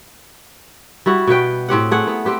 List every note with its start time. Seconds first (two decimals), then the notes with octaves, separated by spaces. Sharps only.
1.06 G3 E4 F#4
1.27 B2 B3 B4 G5
1.68 A2 C4 G4 F#5
1.91 A3 G#4 F#5
2.07 B3
2.25 C4 G4 B4